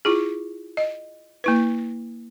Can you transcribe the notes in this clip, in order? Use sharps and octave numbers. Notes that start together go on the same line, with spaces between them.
E4 F4 G#4
D#5
A#3 E4 B4